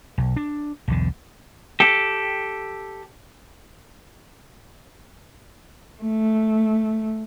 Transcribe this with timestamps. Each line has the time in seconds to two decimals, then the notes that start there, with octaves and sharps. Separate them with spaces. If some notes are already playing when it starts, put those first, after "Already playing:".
0.18 B1
0.36 D4
0.88 B1 E2 D3
1.80 G4 A4
6.02 A3